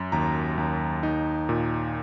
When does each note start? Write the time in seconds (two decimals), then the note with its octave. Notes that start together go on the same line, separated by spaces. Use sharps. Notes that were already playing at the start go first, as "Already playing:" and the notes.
Already playing: F#2
0.12 D#2 A#5
0.58 D#2
1.03 D#4
1.49 A#2